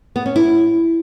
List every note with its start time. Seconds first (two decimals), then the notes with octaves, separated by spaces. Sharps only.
0.16 B3
0.26 C#4
0.36 E4